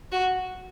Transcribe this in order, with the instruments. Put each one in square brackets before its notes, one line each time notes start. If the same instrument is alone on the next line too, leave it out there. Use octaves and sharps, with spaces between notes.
[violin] F#4